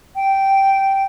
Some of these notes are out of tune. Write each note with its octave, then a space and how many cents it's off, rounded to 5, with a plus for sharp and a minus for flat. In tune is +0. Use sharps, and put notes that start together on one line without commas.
G5 -10